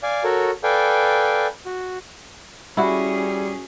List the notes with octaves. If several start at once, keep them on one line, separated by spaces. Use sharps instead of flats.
D5 F5 G#5
F#4 A4 A#4 C#5
A4 B4 D5 F5 G5 G#5
F#4
G3 C#4 E4 F#4 G#4